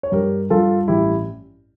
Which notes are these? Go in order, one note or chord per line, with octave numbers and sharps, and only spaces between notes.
C#5
G2 G4 A#4
G2 F4 A4
A1 E4 G4